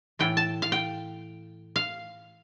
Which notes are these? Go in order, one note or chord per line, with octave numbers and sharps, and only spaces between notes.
A2 E3 A3 G5
A5
F5
G5
F5